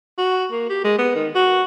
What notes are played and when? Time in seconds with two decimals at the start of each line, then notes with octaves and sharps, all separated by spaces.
0.18 F#4
0.52 A#3
0.69 G4
0.84 G#3
0.98 B3
1.16 D#3
1.35 F#4